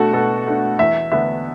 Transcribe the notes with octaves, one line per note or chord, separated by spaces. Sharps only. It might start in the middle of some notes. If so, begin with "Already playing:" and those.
Already playing: B2 A3 D4 F#4 A4
B2 A4
A3 D4
E2 E5
D3 B3 D4 E5